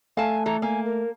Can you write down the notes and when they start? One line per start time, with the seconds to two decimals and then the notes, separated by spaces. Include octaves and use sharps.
0.17 A3 F5 G#5 A5
0.46 E3 A4 A#5
0.62 A#3 G#5
0.85 A#4